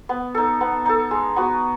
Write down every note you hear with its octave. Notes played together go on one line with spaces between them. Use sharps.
B3
D#4 A4
B3
D#4 A4
G#3
B3 F#4